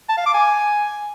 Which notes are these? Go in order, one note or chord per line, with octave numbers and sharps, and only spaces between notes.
A5
F5
D6
G#5